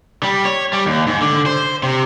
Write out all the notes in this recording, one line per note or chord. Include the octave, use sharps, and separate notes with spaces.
G3
C#5
G3
D#2
G#2
D3
C5
C3